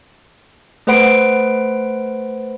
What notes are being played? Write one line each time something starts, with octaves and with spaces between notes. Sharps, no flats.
A3 B4 C5 F#5 B5 D7